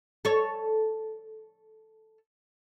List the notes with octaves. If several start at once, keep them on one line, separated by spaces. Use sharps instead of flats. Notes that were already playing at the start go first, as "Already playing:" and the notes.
A4 C#5